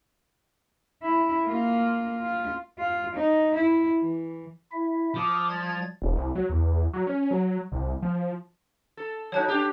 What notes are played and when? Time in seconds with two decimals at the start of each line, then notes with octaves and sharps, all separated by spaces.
1.02 E4
1.46 A#3 F4
2.22 F4
2.79 F4
3.15 D#4
3.55 E4
4.00 E3
4.72 E4 E5
5.15 F3 D6 D#6
5.50 G3 G#6 A6
6.02 E1
6.16 C2
6.35 F#3
6.49 E2
6.93 F#3
7.07 C#4
7.31 F#3
7.72 C2
8.02 F3
8.97 A4
9.32 F#3 D#4 C#5 A5 F#6
9.48 D4 G4